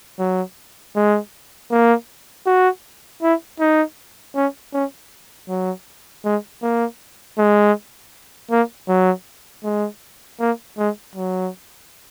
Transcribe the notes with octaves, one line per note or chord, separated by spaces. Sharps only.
F#3
G#3
A#3
F#4
E4
D#4
C#4
C#4
F#3
G#3
A#3
G#3
A#3
F#3
G#3
A#3
G#3
F#3